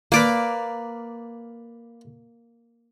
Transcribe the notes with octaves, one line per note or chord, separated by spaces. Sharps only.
A#3 B4 D5 F5 D6